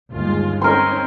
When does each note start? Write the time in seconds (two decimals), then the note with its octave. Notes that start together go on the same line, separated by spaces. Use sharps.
0.12 G1 D#2 G#3 F4
0.61 C4 C#4 D#4 A#4 C6